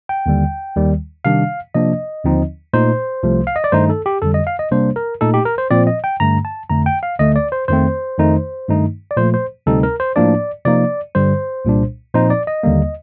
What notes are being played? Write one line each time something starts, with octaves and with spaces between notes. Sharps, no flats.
G5
D#2 D3 G3
D#2 D#3 G3
C3 D#3 G3 D4 F5
C3 F3 A#3 D4 D#5
D#2 D3 F3 C4 D#4
A#2 A3 D#4 C5
C2 C3 F3 A3
F5
D#5
D5
G2 D#3 A3 D#4 C5
A4
G4
F2 D3 G3 A4
D#5
F5
D#5
C3 G3 A#3 D4 C5
A#4
A#2 A3 D#4 A4
G4
A#4
C5
A#2 F3 C4 D5
D#5
G5
G2 D3 A3 A#5
A5
F2 D3 A3 A#5
G5
F5
D2 D3 A3 D#5
D5
C5
F2 D#3 A3 C4 C5
F2 D#3 A3 D#4
G2 D#3 A3 D#4
D5
A#2 F3 A3 C5
C5
D2 C3 G3 C4 D#4 A4
A#4
C5
A2 F3 A#3 D4 D5
C3 F3 A#3 D#4 D5
G2 D3 G3 C5
C2 A#2 G3 D4
A#2 F3 C4 D#4 C5
D5
D#5
D#2 D3 G3 A#3